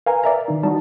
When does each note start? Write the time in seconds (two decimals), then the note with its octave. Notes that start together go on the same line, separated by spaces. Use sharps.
0.06 A#4 B4 F5 G#5 A#5
0.24 A#4 B4 D5 E5 A#5
0.48 D#3 D#4
0.63 G3 D#4 F#4 A5